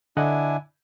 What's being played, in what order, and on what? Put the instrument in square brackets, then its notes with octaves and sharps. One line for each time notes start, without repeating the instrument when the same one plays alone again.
[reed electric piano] D3 D#5 F#5 [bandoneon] D4 E4 G#5